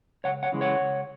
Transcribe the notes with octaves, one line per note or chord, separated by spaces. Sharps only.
C#2 C#5 F#5
C#5 F#5
C#3 E3 G#3
C#5 F#5
C#2